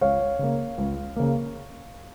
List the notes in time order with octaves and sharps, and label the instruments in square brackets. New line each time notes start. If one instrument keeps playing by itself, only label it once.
[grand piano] C#2 C#5 F5
C#3 A#3
C#2
C#3 A#3